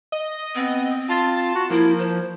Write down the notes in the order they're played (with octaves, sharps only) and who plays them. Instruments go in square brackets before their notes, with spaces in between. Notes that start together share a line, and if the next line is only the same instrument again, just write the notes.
[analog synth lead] D#5
[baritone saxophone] B3 [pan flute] C4
[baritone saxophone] F4 [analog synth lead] A5
[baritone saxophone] F#4
[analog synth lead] F3 [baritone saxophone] A#3 [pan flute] E4
[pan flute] C5